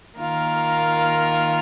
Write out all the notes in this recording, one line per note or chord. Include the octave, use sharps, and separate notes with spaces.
D#3 A#3 F4 A#4